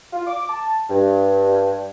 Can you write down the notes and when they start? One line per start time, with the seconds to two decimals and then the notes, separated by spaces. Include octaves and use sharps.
0.12 F4
0.27 D6
0.49 A5
0.89 G2